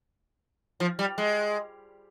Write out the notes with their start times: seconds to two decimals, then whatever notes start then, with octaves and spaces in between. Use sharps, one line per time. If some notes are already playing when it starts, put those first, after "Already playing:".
0.80 F3
0.99 G3
1.18 G#3